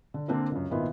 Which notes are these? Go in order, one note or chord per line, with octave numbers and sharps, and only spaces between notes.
D3
D3 A#3 C4 D4 A#4
C#2 F#2
G#1 A#2 D#3 B3 E4 F4